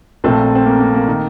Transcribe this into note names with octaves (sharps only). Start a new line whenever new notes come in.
A#1 A#2 A3 C4
C4
A#3
A#3
A#3
D#3